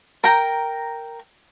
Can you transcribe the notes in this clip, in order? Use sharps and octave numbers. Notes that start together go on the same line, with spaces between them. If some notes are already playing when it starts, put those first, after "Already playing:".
A#4 G5 A#5